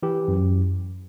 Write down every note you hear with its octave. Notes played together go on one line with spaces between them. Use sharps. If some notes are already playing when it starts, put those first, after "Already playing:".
E3 G4
F#2